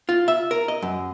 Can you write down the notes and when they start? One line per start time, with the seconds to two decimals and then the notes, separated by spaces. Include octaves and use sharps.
0.09 F4
0.28 E5
0.51 A#4
0.68 D#5
0.82 F#2